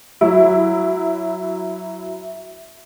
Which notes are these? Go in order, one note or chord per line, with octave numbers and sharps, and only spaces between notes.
F#3 E4